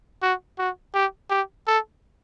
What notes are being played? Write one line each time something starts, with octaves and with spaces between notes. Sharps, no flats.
F#4
F#4
G4
G4
A4